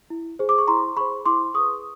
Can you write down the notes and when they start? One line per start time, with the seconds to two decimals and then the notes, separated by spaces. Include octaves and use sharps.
0.10 E4
0.39 G#4 C5
0.49 D6
0.58 C#6
0.67 E4 A#5 C6
0.97 G#4 C5 B5 C#6
1.25 E4 C6 D6
1.54 G#4 B4 C#6 D#6